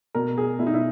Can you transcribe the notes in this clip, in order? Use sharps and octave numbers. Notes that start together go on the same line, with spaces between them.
B2 A#4
G#4
B2 E4
D#4
E4